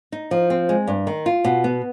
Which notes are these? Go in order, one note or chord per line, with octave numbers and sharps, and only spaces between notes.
D#4
F3
C4
G#3
G2
D#3
F4
B2
B3